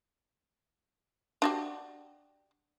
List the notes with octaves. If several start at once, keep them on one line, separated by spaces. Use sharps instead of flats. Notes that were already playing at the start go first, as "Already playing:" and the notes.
D4 F#4 G4